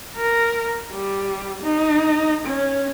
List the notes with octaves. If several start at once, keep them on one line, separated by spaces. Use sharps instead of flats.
A#4
G3
D#4
C#4